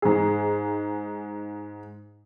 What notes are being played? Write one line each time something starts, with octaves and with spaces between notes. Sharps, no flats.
G#2 G#4